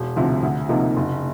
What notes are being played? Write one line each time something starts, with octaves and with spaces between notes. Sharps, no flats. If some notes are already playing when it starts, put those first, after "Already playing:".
Already playing: E1
D2 C3 F3
D2
C3 F3 A#3 D#4
F#1